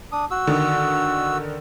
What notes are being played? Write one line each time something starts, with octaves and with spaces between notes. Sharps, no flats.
D4 D#6
F#4 E6
D3 D#3